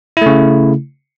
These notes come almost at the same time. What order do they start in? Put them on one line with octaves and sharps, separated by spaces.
E4 A3 C#3